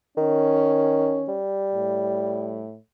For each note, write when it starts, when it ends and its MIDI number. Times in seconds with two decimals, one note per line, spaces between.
0.17 1.23 51
0.17 1.38 61
1.28 2.67 55
1.75 2.77 45